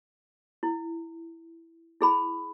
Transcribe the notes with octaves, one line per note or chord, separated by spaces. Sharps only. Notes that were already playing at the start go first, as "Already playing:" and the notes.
E4
E4 G#4 B5